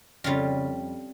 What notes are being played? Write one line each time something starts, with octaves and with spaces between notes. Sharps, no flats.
F2 C#3 G3 F4